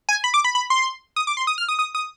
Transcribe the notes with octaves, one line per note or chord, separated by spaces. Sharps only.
G#5
B5
D6
B5
B5
C6
D#6
D6
C6
D#6
F6
D#6
D#6
D#6